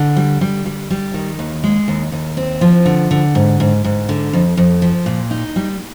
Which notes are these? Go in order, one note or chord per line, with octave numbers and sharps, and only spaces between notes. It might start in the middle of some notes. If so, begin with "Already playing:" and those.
Already playing: D3
G3
G3
G3
G3
D#3
D#2
G#3
D#2
D#2
C4
F3
D3
D3
G#2
G#2
G#2
D3
F2
F2
F3
A#2
D#4
G3